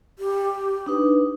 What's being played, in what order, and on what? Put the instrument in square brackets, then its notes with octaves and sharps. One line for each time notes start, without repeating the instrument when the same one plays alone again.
[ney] G4
[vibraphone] D4 D#4 B4